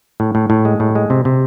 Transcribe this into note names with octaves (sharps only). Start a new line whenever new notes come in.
A2
A2
A2
G#3
A2
G#3
C3
C3